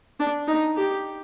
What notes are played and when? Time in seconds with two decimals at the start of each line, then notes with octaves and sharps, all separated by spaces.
0.20 D4
0.47 D#4
0.76 G4